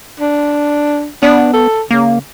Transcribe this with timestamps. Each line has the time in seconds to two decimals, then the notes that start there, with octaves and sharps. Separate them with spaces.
0.20 D4
1.23 B3 D4
1.53 A4
1.91 C#3 A#3